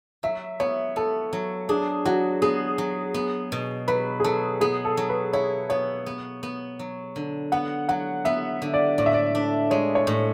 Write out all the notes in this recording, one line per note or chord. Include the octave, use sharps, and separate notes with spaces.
F#3 E5
B3 C#5
B3 A4
F#3
D4 G#4
F#3 F#4
B3 G#4
F#3
B3
B2
F#3 B4
G#4
F#3 A4
B3 G#4
A4
F#3
B4
E4 C#5
B3 C#5
B3
B3
F#3
D3
B3 F#5
F#3 F#5
B3 E5
D3
D5
A2 D5
E5
D5
D4
G#3 C#5
C#5
A2